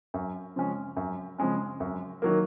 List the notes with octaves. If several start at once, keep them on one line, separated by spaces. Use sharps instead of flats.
F#2
C#3 F3 G#3 C#4
F#2
C#3 F3 G#3 C#4
F#2
D#3 F#3 A#3